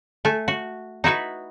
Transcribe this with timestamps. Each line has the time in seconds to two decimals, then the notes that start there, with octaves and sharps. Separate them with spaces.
0.25 A3 G#5
0.48 F#4
1.04 D#4 E4 F#4 B4